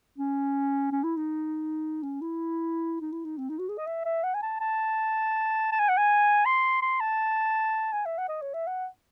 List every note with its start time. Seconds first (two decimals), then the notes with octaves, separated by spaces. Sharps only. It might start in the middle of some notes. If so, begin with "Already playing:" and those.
0.18 C#4
0.92 C#4
1.04 E4
1.17 D#4
2.03 C#4
2.21 E4
3.01 D#4
3.12 E4
3.25 D#4
3.38 C4
3.50 D#4
3.59 F#4
3.69 G#4
3.78 D#5
3.87 E5
4.05 E5
4.24 F#5
4.34 G#5
4.43 A5
4.60 A5
5.72 A5
5.79 G#5
5.89 F#5
5.97 G#5
6.46 C6
6.82 C6
7.00 A5
7.93 G#5
8.06 E5
8.18 F#5
8.29 D#5
8.42 C#5
8.54 E5
8.67 F#5